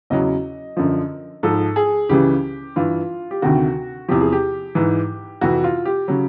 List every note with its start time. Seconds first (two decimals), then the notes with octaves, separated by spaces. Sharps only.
0.10 E2 C#3 F#3 D#5
0.77 F#2 D3 F3
1.43 G#2 F3 A4
1.76 G#4
2.09 C#2 C#3 E3 G4
2.76 G2 E3 F4
3.31 G4
3.42 D2 C3 D#3 F#4
4.08 E2 C3 F3 G4
4.21 G#4
4.32 G4
4.75 G#2 E3
5.41 F2 C3 E3 F#4
5.64 F4
5.85 G4
6.08 C#3 F#3